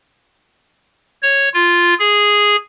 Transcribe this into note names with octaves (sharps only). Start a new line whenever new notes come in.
C#5
F4
G#4